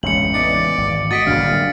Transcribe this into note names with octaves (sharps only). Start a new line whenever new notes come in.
A1 F2 G#2 C#3 C#7 F#7
B3 D#4 D5 C#7
E2
G#1
A3 F#4 D#5 A6 B6 D7
F#1 D#2 A#2 D3 G3 D4 F5